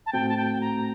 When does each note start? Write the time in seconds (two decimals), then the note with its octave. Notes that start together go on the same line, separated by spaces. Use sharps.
0.06 A5
0.13 A2 A3 C4 F#4 G5
0.29 A5
0.37 G5
0.61 A#5